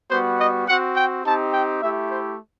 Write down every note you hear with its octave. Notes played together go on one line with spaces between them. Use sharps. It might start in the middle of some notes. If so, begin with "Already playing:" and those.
G3 B3 F#4 C5
D#5
C4 F#4 F#5
G5
C4 D#4 G4 A5
G5
A3 E4 G4 E5
C5